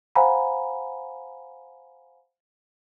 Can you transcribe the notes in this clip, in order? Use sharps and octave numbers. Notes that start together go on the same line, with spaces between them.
C5 F5 F#5 G#5 A#5 B5